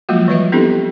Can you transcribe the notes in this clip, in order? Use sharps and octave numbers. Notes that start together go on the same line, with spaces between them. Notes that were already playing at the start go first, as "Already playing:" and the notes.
F3 F#3 G#3 A#3 F4 F#4
E3 G3 B4 D#5 E5
B3 C4 D4 E4 G4 A4